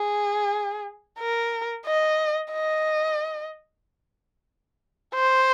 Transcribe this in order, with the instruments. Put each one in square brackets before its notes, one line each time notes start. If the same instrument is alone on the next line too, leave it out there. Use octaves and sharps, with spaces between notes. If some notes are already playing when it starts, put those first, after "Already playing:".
Already playing: [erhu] G#4
A#4
D#5
D#5
C5